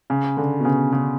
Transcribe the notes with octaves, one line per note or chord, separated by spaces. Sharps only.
C#3
D3
B2
C#3
C#3